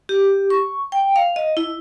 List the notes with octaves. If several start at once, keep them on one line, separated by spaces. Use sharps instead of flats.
G4
C#6
G5
F5
D#5
E4